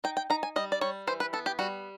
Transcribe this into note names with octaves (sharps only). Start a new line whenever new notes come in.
D#4 G5
G5
D#4 A#5
G#5
G3 D#5
D5
G3 C#5
E3 C5
B4
B3 A4
G4
G3 F#4